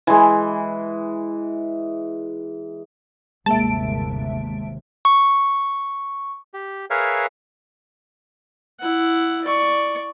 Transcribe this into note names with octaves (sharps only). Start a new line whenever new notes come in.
E3 G#3
G1 D#2 C3 G#3 A#3 E5 A5 D7
C#6
G4
G#4 A#4 B4 C#5 E5 F5
E4 F#5
D5 C#6